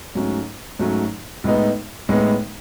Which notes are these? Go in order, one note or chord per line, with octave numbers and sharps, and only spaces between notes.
G#2 F#3 A3 C#4
G#2 F#3 A3 C#4
A2 G#3 B3 D#4
A2 G#3 B3 D#4